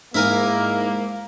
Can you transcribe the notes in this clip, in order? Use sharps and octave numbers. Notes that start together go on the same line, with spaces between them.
G#2 A#3 E4 A#4 G#5